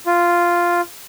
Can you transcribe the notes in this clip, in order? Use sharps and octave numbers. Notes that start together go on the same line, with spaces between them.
F4